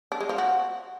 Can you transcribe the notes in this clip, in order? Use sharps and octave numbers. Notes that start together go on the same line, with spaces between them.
D4
G#3
F3
F#4